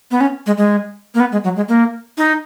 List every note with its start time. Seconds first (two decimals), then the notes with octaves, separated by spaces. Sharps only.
0.11 B3
0.21 C#4
0.46 G#3
0.57 G#3
1.15 A#3
1.20 B3
1.32 G#3
1.44 F#3
1.56 G#3
1.69 A#3
2.18 D#4